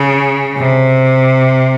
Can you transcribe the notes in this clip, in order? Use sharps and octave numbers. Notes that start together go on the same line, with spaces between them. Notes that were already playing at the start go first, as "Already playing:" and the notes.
Already playing: C#3
C3